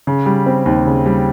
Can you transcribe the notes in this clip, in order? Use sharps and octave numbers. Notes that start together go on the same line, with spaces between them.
C#3
G3
C4
D#2
C#3
G3